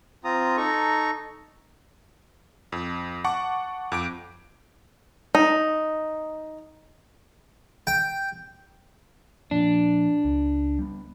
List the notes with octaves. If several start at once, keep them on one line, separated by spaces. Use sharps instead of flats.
C4 F4 A#5 D#6
D#4 A4 A#5 C#6
F2
F#5 A5 C#6 D6
F2 D6 D7
D#4
G5
A#2 F3 D4
C#2
G3 B3